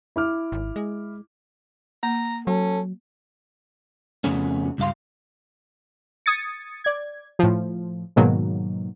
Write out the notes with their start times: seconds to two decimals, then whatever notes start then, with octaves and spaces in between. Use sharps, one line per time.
0.16 E4 D6 F6
0.52 G#1
0.76 G#3
2.03 A#3 A#5
2.47 F#3 C#4 A4
4.24 F2 C#3 A3 B3 C#4
4.78 C#2 G2 F5 C6
6.26 D#6 G#6 A6 C#7
6.84 D5 G#6
7.39 A2 F3
8.16 G#2 B2 D#3 F#3 A#3